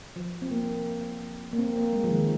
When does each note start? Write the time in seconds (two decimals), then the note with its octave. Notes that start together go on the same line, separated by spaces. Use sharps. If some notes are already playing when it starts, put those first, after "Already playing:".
0.16 F3
0.42 C4
0.51 A#3
1.53 A#3
1.58 C4
1.76 A#3
1.93 G#3
2.04 F3
2.11 D#3